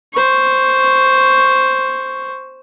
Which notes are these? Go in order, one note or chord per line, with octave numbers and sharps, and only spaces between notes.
C5 C#6